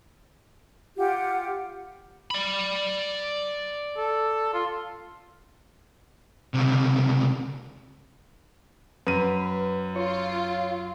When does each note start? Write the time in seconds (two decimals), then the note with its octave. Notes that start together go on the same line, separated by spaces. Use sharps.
0.97 F4 G4 F#5
2.31 D5 B5
3.97 A4
4.54 F4
6.54 C#2 C3
9.07 F#2 B4 D#7
9.96 F4 C#5